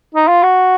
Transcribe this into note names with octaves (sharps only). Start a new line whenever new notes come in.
D#4
F4
F#4